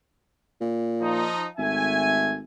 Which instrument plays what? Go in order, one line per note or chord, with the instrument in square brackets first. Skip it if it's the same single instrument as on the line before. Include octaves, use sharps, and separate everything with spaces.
[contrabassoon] A#2
[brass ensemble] F3 D#4
[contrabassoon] G#1 [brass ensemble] A3 E5 G#5